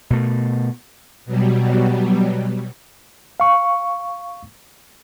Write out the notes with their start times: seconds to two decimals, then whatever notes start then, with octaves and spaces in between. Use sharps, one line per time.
0.10 B2 A3
1.26 B2 F#3 G3
3.40 F5 C#6